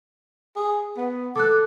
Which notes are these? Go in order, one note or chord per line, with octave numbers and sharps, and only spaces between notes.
G#4
B3
A4 D6 F#6